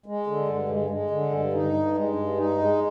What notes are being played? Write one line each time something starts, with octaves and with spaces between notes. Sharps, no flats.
G#3
D3
G2
G#3
G#3
D3
G2
D#4
G2
G#3
G2
D#4
G#3